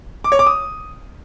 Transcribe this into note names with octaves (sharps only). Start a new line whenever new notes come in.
D6
C#5
D6
D#6